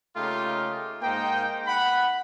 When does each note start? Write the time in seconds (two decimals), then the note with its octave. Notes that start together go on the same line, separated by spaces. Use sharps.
0.16 C#3 A3 A#3 D#4 F4 G4
1.02 G#2 A#3 D#4 C5 G5
1.67 F#5 B5